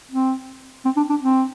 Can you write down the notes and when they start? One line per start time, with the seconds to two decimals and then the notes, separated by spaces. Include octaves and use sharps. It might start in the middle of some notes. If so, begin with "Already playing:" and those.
0.11 C4
0.85 C4
0.96 D4
1.10 D4
1.22 C4